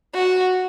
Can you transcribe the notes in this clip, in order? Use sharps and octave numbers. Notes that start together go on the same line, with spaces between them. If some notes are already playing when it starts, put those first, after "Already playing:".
F#4